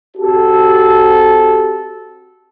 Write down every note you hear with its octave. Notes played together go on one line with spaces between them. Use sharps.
C4 F#4 G4 A4